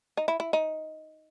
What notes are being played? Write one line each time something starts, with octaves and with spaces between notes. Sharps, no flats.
D#4
E4
E4
D#4